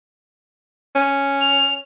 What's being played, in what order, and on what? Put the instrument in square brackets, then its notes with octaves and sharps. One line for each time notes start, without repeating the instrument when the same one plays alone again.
[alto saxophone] C#4
[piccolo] F7